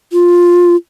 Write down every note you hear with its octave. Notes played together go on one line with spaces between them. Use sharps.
F4